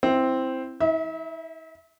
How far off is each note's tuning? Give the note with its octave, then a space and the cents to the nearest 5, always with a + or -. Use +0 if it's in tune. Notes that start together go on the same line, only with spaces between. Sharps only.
C4 +0 E4 +0
E4 -45 E5 +0